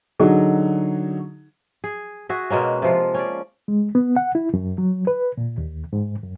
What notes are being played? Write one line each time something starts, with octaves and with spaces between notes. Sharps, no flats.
D3 F#3 D#4 F#4 G#4
G#4
F#4 G#4 E5
B2 G#3 A#3 C#4
C3 F3 F4
C#4 D5
G#3
B3
F#5
E4
F#2
F#3
B4
A#2
D#2
G#2
F#2